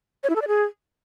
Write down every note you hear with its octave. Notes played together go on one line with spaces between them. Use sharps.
C#5
E4
A4
D5
G#4